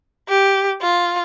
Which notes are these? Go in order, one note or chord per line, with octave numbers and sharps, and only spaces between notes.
G4
F4